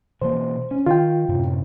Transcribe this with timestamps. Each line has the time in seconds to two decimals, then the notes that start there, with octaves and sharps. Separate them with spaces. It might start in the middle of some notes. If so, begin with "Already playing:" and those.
0.22 B2 E3 A#3 C5
0.71 C#4
0.86 D#3 F4 G5
1.29 F#2 A2 C3